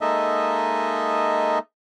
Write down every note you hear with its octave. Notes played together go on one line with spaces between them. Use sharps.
G#3 A#3 D#4 A4 D#5 E5